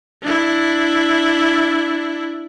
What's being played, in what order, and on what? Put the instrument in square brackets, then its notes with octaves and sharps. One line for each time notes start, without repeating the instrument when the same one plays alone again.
[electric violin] D4 E4